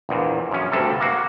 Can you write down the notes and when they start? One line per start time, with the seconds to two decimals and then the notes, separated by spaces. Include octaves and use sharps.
0.09 A#1 E2 A#2
0.51 F#2 C#4
0.72 D2 G2 C3 A4
1.00 A#3 F#4